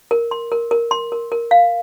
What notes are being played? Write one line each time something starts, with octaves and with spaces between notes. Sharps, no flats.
A#4
C6
A#4
A#4
C6
A#4
A#4
F5